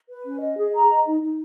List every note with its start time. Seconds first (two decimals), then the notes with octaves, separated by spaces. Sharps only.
0.09 B4
0.25 C#4
0.41 D#5
0.57 G#4
0.74 A#5
0.90 D#5
1.06 D#4
1.22 D#4